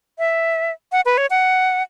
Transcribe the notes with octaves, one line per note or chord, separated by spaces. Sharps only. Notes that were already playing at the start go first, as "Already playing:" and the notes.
E5
F#5
B4
C#5
F#5